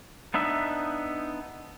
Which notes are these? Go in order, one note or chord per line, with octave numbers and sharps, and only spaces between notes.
B3 D4 D#4 E5